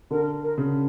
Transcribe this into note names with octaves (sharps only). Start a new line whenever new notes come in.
D3 A#4
A#4
C#3